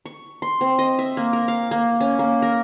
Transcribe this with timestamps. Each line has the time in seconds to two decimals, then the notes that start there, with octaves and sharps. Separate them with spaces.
0.06 C#6
0.42 C6
0.61 C4
0.79 D#5
0.99 E5
1.17 A#3
1.33 A#4
1.48 F5
1.71 A#3
2.00 C#4
2.19 A#3
2.42 A#4